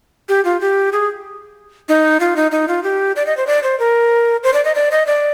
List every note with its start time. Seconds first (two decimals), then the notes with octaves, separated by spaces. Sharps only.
0.29 G4
0.45 F4
0.61 G4
0.93 G#4
1.89 D#4
2.20 F4
2.36 D#4
2.52 D#4
2.68 F4
2.84 G4
3.16 D5
3.27 D#5
3.37 C5
3.47 D5
3.63 C5
3.79 A#4
4.43 C5
4.54 D5
4.65 D#5
4.75 D5
4.92 D#5
5.07 D5